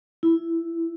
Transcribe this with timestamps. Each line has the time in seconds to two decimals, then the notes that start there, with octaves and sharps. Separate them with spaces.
0.23 E4